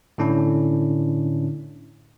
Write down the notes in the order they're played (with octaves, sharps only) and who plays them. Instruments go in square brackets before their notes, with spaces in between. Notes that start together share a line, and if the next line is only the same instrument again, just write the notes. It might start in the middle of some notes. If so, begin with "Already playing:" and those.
[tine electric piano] A2 D3 C#4 D4 E4